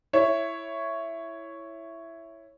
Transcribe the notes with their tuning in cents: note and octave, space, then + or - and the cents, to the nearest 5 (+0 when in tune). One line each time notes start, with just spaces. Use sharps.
E4 +5 C#5 +0